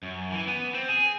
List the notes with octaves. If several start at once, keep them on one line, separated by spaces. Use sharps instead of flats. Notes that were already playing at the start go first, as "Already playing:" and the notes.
F#2
E3
B3
C4
G#4